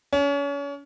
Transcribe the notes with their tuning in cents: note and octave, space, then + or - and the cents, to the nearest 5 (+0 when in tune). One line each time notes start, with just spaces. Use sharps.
C#4 +35